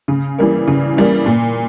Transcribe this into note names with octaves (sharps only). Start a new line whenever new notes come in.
C#3
E3 G3 A#3
C#3
E3 G3 A#3
A#2